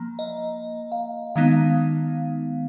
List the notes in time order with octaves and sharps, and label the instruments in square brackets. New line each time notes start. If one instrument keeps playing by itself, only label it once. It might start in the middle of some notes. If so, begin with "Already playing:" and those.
Already playing: [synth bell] F3 A#3 A#5
D#5
F5
D#3 G#3 B3 D#4 F5